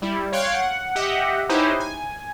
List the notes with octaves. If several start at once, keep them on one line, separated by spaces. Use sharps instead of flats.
G3 E4
C#5 F5 G5 C6 F#6 G#6
F#5
G4 D#5 E5 F#5
C#4 D#4 E4 G4 B4 C5
G#5